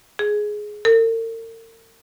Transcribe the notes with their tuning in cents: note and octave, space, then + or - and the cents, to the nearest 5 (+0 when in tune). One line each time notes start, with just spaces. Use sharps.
G#4 +10
A#4 -45